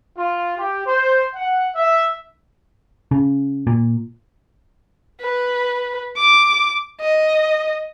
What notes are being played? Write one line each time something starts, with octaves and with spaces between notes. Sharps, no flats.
F4
G4
C5
F#5
E5
C#3
A#2
B4
D6
D#5